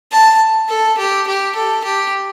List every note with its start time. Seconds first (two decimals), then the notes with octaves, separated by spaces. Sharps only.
0.12 A5
0.69 A4
0.98 G4
1.27 G4
1.56 A4
1.85 G4